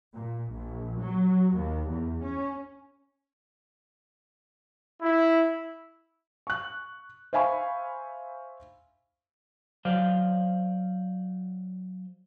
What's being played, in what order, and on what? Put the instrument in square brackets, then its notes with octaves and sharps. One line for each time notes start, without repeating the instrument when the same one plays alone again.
[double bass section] A#2
A#1
F#3
D#2
E2
C#4
[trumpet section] E4
[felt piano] C#6 F#6
C5 E5 F5 G#5 B5 C#6
[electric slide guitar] F#3 C5 D5 F5